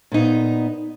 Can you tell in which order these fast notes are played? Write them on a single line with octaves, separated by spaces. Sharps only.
A#2 D#4 B3